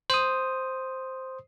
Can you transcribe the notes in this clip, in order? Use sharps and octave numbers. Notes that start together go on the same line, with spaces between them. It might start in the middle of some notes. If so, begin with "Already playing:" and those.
C5 D#6